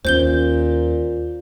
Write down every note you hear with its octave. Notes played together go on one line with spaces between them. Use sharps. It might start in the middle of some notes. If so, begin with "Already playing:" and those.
D#2 A#2 C#4 C5 G6 G7